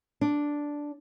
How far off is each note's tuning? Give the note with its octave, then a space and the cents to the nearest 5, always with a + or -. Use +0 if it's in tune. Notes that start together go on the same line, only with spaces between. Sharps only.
D4 -5